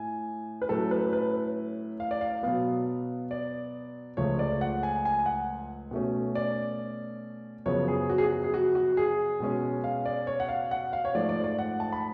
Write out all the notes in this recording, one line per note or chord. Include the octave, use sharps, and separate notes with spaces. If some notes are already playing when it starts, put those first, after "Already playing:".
Already playing: A2 G#5
B4
A2 F#3 C#4 A4
B4
B4
F5
D5
F5
B2 F#3 B3 F5
D5
C#2 C#3 F3 A3 C#5
D5
F#5
G#5
G#5
F#5
B2 A3 C#4
D5
F#2 C#3 F3 B3 C#5
G#4
F#4
G#4
F#4
G#4
F#4
F#4
G#4
B2 G#3 C#4
F5
D5
C#5
F#5
F5
F#5
F5
C#5
G#2 F3 A3 D5
D5
D5
F#5
A5
B5